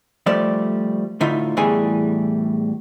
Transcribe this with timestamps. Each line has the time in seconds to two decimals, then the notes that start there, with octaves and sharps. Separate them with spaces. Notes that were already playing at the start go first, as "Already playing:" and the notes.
0.26 F3 G3 A3 D5
1.21 A2 D3 D#4 F4 E5
1.57 E2 A2 E3 G3 G#4 G#5